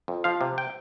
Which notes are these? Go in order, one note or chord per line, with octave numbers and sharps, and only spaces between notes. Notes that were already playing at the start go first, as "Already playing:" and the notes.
F2
F3 F5
C3
G5